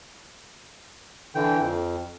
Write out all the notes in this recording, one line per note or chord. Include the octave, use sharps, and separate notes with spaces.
D3 E3 G5
F2